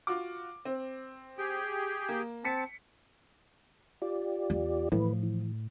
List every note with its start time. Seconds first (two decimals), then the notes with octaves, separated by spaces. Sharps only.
0.07 F4 F#4 D6
0.65 C4
1.38 G4 G#4 G5
2.09 A#3
2.45 C4 A5 B6 C#7
4.02 F4 G4 D5
4.50 E2
4.92 A2 E3 F3 B4
5.23 E3